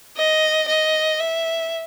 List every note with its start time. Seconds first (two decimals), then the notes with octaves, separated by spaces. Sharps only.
0.17 D#5
0.68 D#5
1.20 E5